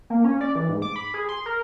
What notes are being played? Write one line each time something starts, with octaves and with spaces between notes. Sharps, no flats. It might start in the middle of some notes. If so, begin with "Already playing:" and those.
A#3
C#4
D5
E3
G#2
D6
B5
G#4
C6
A#4